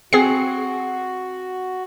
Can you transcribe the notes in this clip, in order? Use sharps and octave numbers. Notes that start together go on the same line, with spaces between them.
C4 F#4 G#4 F#5 C#6 C7